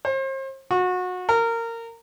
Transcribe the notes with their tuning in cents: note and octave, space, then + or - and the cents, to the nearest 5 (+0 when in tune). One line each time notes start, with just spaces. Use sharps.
C5 +40
F#4 -25
A#4 -20